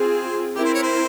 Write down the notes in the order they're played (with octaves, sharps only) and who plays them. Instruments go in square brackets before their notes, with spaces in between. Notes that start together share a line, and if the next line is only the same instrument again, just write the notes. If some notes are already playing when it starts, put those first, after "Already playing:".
Already playing: [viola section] C4 F4 G#4 [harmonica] C5
[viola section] C4 E4 A#4 [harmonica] G4
[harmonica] C5
C#5
C5